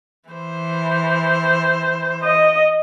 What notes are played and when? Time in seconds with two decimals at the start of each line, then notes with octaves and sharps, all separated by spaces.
0.30 E3 C5
2.23 D#5